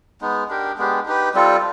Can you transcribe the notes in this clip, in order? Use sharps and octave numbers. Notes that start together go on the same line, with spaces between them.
G#3 B3 D#4
D4 G4 A#4
G#3 B3 D4 G4
D#4 G4 B4
G3 C4 F4 A4